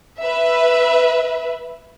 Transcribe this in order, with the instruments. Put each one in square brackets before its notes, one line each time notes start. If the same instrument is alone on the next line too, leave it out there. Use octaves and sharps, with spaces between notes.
[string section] B4 E5